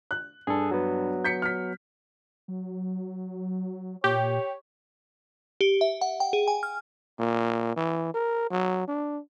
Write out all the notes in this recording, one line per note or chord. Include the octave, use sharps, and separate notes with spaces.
F#6
G2 G#4 A4
F#3 B3
G6 B6 C#7
F6 B6
F#3
A#2 G4 C#5
G4
E5
F#5
G5
G#4
G#5
F6
A#2
E3
A#4
F#3
D4